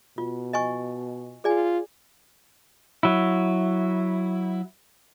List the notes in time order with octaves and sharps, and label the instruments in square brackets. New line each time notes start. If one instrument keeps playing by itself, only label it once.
[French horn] B2 [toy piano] F4
[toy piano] D#5 G#5 C#6
[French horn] F4 [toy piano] G#4 D5 G#5
[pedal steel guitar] F#3 E4